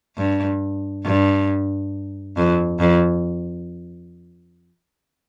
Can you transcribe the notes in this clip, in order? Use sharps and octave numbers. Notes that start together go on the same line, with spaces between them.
G2
G2
F2
F2